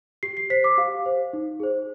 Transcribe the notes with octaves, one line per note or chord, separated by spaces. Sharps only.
G4 C7
C7
C5 B6
D6
G4 F5
C5
D#4
G#4 C5